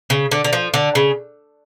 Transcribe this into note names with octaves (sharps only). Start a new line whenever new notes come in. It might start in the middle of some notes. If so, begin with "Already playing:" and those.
C#3
D3
D3
F3
D3
C#3